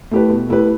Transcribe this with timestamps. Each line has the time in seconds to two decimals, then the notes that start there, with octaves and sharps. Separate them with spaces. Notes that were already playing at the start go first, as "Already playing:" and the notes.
0.11 A3 E4 G4 B4
0.29 B2
0.48 A3 E4 G4 B4